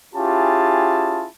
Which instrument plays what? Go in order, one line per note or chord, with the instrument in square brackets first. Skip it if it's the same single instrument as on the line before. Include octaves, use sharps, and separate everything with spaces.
[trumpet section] C#4 E4 F4 G4 G#4 A5